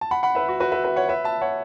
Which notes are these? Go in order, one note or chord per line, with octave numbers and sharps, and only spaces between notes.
A5
F#5 B5
F#5 B5
B4 E5
F#4
F#4 B4
B4 E5
B4 E5
C#5 F#5
B4 E5
E5 A5
C#5 F#5